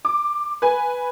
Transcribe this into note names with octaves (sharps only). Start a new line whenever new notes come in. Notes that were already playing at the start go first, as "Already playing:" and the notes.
D6
B4 G#5